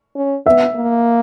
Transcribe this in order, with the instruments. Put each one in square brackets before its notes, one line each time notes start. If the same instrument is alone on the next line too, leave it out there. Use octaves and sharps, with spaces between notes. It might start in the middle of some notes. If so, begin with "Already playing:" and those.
[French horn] C#4
[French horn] B3 [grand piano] E5
[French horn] A#3